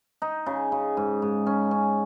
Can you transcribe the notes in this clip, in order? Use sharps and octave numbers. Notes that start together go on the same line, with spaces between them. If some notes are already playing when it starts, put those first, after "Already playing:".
D#4
C#3
C#3
G#2
G#2
C#4
C#4